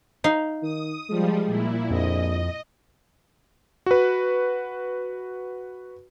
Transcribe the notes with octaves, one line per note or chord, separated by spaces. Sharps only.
D#4 F5
D#3 D#6
F3 G3 G#3
A#2 E4
A#1 F2 D#5
F#4 B4